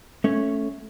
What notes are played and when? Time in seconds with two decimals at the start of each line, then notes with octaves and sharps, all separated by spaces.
0.24 A3 C#4 C#5